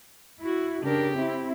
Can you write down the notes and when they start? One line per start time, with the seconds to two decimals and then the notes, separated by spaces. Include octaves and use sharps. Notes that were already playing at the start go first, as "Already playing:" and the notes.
0.44 E4 F#4
0.84 C#3 D4 G4 A#4
1.15 C4 E4